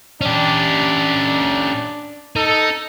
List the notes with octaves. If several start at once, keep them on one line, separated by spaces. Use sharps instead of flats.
C#4 D4 G4
D#4 A4